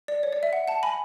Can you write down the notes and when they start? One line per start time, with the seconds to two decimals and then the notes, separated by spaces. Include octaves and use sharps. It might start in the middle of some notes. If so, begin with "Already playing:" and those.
0.08 D5
0.23 C#5
0.33 D5
0.43 E5
0.53 F#5
0.68 F#5 A5
0.83 G#5 B5